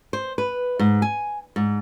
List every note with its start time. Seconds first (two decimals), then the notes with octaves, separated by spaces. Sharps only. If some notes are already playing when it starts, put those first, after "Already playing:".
0.13 C5
0.38 B4
0.79 G#2
1.02 G#5
1.56 G#2